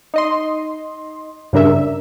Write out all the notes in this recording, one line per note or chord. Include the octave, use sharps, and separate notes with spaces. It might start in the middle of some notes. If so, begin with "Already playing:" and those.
D#4 D#5 C6
G2 C#3 D4 A#4 E5